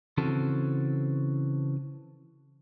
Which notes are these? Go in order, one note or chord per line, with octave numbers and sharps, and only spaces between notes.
C#3 E3 C4 F#4 A4